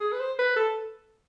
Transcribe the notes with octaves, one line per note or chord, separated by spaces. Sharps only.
G#4
B4
C5
B4
A4